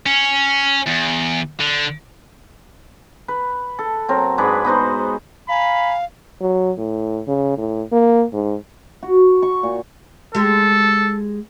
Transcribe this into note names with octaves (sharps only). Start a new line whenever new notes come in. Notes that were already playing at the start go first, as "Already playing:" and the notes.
C#4
E2
D3
B4
A4
F#3 C4 A#4
G#2 D4 G#4 B4
B3 D#4 F#4 C5
F5 G#5 A#5 B5
F#3
A2
C#3
A2
A#3
G#2
F#4
C#6
A#2
G#3 G4 A4